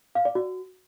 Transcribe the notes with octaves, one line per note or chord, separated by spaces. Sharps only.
F5
D5
F#4